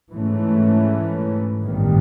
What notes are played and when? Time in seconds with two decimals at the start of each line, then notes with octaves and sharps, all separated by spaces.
0.11 G#2 E3 A3 C#4
1.63 A1 G2 D#3 G3 B3